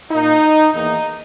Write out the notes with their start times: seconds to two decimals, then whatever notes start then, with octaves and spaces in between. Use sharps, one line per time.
0.11 A#2 A#3 D#4
0.73 E2 D#3 A#3 D#4